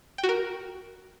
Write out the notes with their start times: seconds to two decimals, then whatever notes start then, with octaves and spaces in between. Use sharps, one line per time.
0.18 G5
0.24 F#4
0.29 A#4